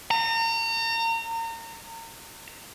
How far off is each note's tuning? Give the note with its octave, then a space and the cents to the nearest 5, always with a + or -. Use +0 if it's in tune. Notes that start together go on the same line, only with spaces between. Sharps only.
A#5 -35